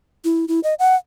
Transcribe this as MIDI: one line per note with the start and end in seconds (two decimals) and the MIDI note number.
0.24 0.45 64
0.48 0.60 64
0.63 0.74 75
0.79 0.95 78